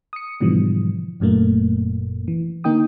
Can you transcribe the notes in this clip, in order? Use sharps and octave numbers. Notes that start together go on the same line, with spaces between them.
D#6 C#7
G#2 B2 D3 E3 F3 G3
G1 F#2 A#2 A3 A#3
E3
D3 A#3 D#4 G5 D#6